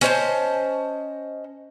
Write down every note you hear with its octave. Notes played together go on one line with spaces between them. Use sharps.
C#4 C5 D#5 A5